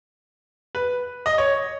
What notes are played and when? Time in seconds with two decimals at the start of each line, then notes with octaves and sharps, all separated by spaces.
0.75 B4
1.26 D#5
1.38 C#5